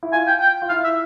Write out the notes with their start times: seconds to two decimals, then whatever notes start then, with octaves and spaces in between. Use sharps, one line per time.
0.03 E4
0.12 F4 G#5
0.27 G5
0.40 G5
0.62 F4
0.69 E4 F5
0.84 E5